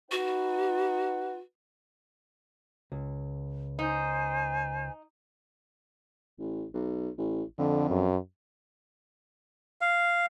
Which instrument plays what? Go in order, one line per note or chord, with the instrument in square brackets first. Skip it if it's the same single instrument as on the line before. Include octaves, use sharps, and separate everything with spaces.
[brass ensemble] D#4 B4 F#5 [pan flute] F#4
[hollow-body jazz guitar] C#2
[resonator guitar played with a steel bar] D#4 [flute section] C5 G#5
[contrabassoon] A1
B1
A1
[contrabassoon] F2 [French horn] D3
[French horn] F#2
[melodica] F5